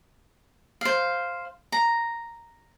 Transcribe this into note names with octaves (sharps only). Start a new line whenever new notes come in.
C5 F5
A#5